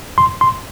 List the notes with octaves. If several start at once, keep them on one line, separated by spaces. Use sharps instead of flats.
C6
C6